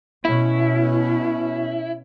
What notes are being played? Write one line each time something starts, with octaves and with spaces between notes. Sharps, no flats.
B2 C#4 E4